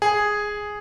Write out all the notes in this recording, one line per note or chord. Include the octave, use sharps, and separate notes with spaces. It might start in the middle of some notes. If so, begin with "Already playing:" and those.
G#4